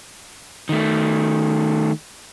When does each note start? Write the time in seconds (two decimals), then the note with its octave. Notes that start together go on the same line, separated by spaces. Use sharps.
0.69 D#3 A3